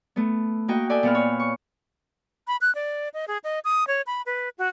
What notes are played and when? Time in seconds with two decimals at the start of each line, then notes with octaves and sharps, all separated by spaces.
0.16 A3 B3
0.68 A#3 F#4 D#5 G5
0.89 A4 D5 E5 G5 G#5
1.03 A#2 B3 F6
1.14 C#5
1.40 C#6
2.47 B5
2.61 F#6
2.75 D5
3.14 D#5
3.28 G#4
3.44 D#5
3.65 D#6
3.87 C#5
4.07 B5
4.26 B4
4.58 F#4